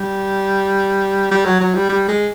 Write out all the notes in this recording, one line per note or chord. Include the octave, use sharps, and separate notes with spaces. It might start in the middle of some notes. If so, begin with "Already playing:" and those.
Already playing: G3
G3
F#3
F#3
G3
G3
G#3